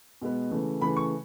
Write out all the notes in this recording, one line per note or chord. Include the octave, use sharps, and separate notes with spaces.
B2 G#3 B3
C#3 E3 A3
C#3 E3 A3 B5
C#6